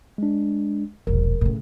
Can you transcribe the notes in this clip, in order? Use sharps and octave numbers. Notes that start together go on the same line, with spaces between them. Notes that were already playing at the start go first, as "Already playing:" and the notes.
G#3 D4
E1 A#1 A#4
A2 C#3